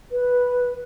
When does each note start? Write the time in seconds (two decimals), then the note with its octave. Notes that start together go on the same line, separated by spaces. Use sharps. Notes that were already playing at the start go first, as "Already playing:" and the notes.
0.12 B4